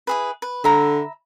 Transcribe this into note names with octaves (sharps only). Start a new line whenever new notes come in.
E4 G#4 B4
B4
D3 E5 A#5 B5